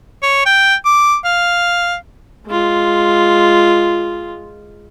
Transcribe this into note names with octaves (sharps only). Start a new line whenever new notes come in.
C#5
G5
D6
F5
G#3 F4